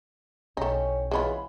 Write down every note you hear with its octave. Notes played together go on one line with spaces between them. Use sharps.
B1 A3 C#4 D#4 E4 G4
E3 G#3 C#4 F4 F#4 B5